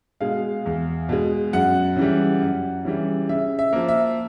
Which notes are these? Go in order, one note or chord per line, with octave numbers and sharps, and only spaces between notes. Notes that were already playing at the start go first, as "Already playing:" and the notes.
B2 G#3 F5
E2
B2 G#3
F#2 F#5
C#3 E3 G3
F#2
C#3 E3 G3
C#3 E5
E5
F3 A#3
E5